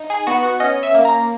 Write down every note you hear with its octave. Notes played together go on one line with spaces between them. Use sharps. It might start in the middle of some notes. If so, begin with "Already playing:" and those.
Already playing: D#4
G#4
B3 F#4
F#4
C#4 D#5
E5
A#3
A#5